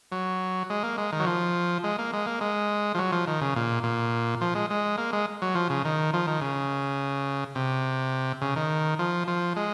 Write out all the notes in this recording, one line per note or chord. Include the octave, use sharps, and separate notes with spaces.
F#3
G#3
A#3
G#3
D#3
F#3
F3
G#3
A#3
G#3
A#3
G#3
F3
F#3
F3
D#3
C#3
A#2
A#2
F3
G#3
G#3
A#3
G#3
F#3
F3
C#3
D#3
F3
D#3
C#3
C3
C#3
D#3
F3
F3
G#3